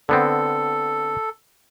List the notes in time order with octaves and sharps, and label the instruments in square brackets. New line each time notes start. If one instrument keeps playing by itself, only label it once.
[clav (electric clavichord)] D3 B3 C4 [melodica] A4